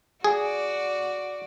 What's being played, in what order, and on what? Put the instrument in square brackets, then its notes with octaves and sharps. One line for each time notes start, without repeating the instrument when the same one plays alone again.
[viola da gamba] F#4 D5 [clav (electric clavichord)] G#4